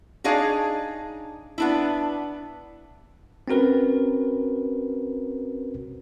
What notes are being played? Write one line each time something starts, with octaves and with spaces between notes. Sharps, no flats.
D4 D#4 G#4 C#5 F5
B3 D4 E4
C4 C#4 F#4 A#4 B4